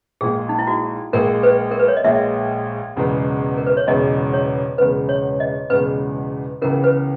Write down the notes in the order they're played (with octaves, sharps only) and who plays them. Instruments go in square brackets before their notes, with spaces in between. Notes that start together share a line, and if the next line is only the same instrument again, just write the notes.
[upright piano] A#1 A#2 G#3 [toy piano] G#4
[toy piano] D#4
E4
F#4
[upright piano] A#1 A#2 G#3 [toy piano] A#4
[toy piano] B4
A#4
B4
C#5
D#5
[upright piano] A#1 A#2 G#3 [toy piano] E5
[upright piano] E1 E2 C#3 G#3 B3
[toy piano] A#4
B4
C#5
[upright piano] E1 E2 C#3 G#3 B3 [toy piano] D#5
[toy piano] C#5
[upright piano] E1 E2 C#3 G#3 B3 [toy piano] B4
[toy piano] C#5
D#5
[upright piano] E1 E2 C#3 G#3 B3 [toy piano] B4
[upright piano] C#2 C#3 E3 B3 [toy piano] A#4
[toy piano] B4